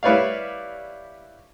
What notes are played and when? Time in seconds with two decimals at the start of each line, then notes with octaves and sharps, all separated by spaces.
0.03 G3 E4 B4 C#5 D5 F5